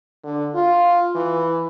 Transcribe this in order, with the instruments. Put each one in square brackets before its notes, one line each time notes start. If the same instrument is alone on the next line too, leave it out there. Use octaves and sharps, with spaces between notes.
[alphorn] D3
F4
E3